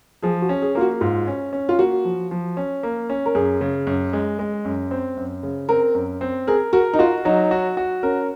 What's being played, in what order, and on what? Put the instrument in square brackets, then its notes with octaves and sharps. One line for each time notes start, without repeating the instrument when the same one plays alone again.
[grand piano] F3 [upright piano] G#4
[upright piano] F#4
[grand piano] C#4
[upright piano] G#4
[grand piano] A#3 [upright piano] F4
[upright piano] F#4
[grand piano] G#2 [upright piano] F4
[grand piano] C#4
C#4
[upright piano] F4
[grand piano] A#3 [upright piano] F#4
[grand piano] F3
F3
C#4
A#3
C#4
[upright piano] A#4
[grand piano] F#2 [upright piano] G#4
[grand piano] C#3
F#2
G#3
G#3
F#2
C4
F#2
C#3
[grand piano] C4 [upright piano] A#4
[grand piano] F#2
C4
[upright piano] G#4 [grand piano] A#4
[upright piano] F#4 [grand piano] A#4
[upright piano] D#4
[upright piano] F4 [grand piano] F#4
[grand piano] F#3 [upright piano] D#4
[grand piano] F#4
F#4
[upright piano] C#4 [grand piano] A#4